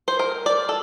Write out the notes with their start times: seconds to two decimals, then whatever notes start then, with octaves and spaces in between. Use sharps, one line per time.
0.08 C5
0.19 A#4
0.46 D5
0.69 A4